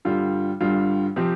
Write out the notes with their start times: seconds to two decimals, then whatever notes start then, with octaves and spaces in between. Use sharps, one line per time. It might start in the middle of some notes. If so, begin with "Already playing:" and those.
0.05 G2 D3 G3 F4
0.61 G2 D3 G3 F4
1.16 C3 F3 C4 G4